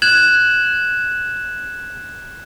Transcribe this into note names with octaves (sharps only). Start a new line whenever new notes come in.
F#6 G#6 E7 F#7